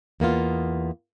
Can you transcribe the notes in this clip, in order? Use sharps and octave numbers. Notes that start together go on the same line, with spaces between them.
E2 A#3 B3 F4